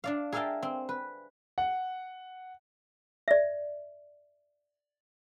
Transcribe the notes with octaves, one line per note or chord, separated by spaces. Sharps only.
D4 D5 F5
G#4 A#4 E5 F5 G5 A5
C4
B4
F#5
D5 E5